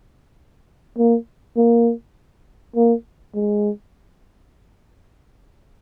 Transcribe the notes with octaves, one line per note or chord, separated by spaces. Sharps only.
A#3
A#3
A#3
G#3